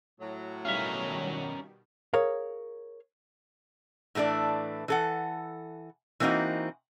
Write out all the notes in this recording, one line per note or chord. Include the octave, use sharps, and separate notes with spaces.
A2 F#3
B2 D#3 G3 C#4 A#4 E5 F5
G#4 A#4 C#5 F5
A2 E3 A3 D4 D5
E3 A4 F#5
E3 A#3 C4 D#4 F#4